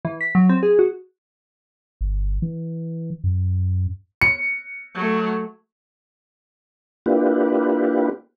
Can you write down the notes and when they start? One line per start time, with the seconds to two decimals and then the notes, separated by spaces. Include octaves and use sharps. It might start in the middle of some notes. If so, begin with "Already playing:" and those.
0.05 E3
0.21 B6
0.35 F#3
0.49 C4
0.63 G#4
0.79 F#4
2.01 G1
2.42 E3
3.24 F#2
4.21 C#7
4.95 F#3 A3
7.06 A#3 D4 E4 F4 G4 B4